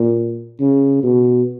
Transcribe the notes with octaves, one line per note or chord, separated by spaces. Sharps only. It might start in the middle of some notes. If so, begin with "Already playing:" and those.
Already playing: A#2
C#3
B2